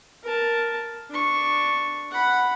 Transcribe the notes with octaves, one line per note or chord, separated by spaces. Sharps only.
A#4 A5
D4 C#6
F#5 B5